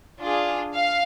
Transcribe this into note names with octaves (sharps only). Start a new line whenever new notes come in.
D4 F4 G#4
F5